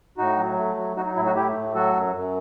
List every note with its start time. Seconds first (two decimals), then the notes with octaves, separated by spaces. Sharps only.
0.18 A2 D#4 F#4
0.38 F#3
0.57 A3
0.76 F#3
0.96 F#3 D#4 F#4
1.07 D#4
1.16 A2 E4
1.26 D#4 F#4
1.36 A3 E4 G4
1.55 A2
1.75 F#3 F#4 A4
1.95 F#2
2.14 F#2